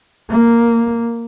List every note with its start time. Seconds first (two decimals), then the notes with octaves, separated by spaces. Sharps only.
0.29 A#3